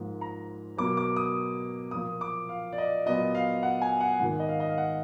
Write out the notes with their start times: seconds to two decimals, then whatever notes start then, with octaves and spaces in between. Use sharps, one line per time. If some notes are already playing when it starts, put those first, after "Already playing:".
Already playing: G#2 F3 A#3
0.21 A#5
0.77 B2 F#3 A#3 D6
0.97 D6
1.16 D#6
1.91 A#2 F3 A#3 D#6
2.21 D6
2.49 F5
2.73 D5
2.78 D#5
3.06 A#2 F#3 B3 D#5
3.35 F5
3.63 F#5
3.81 G#5
4.00 F#5
4.19 G#2 D#3 A#3 F#5
4.40 D#5
4.49 F5
4.60 D#5
4.69 F5
4.78 F#5